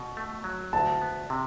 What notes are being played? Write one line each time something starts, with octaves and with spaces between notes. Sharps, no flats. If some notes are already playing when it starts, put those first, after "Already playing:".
Already playing: B2
A3
F#3
D2 A5
B3
C3